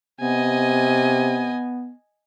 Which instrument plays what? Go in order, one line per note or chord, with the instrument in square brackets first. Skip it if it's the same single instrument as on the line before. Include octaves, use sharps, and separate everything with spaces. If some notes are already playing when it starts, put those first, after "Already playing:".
[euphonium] C3 [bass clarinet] B3 [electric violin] D#5 G#5